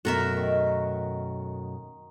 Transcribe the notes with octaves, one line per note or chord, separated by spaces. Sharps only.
F#2 B2 A3 F#4 A#4 E5
D#3 C#6